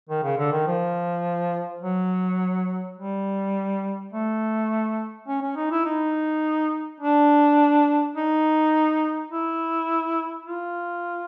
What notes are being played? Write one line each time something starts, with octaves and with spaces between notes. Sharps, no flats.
D#3
C#3
D3
D#3
F3
F#3
G3
A3
C#4
C#4
D#4
E4
D#4
D4
D#4
E4
F4